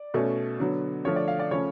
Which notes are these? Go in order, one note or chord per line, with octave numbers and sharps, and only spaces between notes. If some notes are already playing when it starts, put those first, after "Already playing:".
Already playing: D5
B2 A3 C#4
D3 F#3 B3
D3 F3 A3 C#5
D5
F5
D5
C#3 F3 A3 C#4 C#5